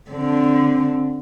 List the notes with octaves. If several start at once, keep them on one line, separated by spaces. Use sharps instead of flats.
D3 C4